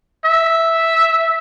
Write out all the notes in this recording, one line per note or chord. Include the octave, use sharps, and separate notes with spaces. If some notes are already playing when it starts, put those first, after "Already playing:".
E5